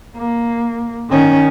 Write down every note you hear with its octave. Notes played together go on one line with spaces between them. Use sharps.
A#3
D#3 C#4